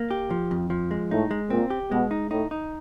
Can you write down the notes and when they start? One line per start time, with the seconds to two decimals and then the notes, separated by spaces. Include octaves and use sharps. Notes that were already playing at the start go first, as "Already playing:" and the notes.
Already playing: A#3
0.11 G4
0.30 F3
0.51 F2
0.70 F3
0.91 G#3
1.11 A2 D#4
1.31 G#3
1.50 A#2 C4
1.70 G4
1.91 B2 G#3
2.11 D#4
2.31 A2 D#4
2.51 D#4